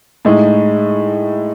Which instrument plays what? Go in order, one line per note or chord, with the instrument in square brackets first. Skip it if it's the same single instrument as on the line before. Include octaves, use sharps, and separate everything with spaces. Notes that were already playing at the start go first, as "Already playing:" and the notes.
[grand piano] A2 G#3 D#4